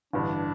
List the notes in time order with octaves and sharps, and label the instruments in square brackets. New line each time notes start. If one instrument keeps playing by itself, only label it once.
[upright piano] A1 G2 D3 [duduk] D4